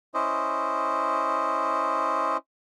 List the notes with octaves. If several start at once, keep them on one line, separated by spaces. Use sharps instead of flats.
C#4 E4 C5 D#5